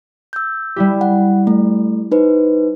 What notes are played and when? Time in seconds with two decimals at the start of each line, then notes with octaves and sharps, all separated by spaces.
0.33 E6 G6
0.76 G3 E4 G4
1.01 F#5
1.47 A3
2.11 D#4 B4 C5